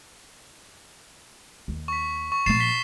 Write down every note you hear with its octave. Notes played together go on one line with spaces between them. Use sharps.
D#2
C#6 B6
C#6
A#2 F3 A6 C7 E7
B6 G7